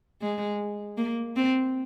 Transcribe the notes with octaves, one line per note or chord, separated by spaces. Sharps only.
G#3
A#3
C4